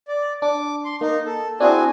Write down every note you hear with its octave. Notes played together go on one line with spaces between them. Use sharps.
D5
D4 D6
C6
A#3 D#4
A4
C4 D4 E4 F#4 G#4 G#5